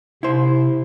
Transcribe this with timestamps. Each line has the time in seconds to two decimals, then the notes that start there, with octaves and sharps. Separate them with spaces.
0.23 C3 E4 C5